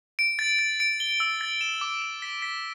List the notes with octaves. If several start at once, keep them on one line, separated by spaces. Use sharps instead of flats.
D7
A6
A6
D7
G7
E6
A6
E7
D6
E7
B6
B6